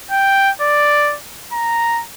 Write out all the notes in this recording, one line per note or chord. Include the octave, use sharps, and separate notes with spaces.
G5
D5
A#5